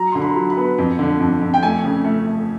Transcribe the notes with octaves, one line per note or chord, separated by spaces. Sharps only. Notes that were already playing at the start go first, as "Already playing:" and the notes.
Already playing: F#3 A#5
D3 C6
B5
F#3
B5
B3
F2
D3
F2
F2
G5
A3 G#5
C#3
A3
A3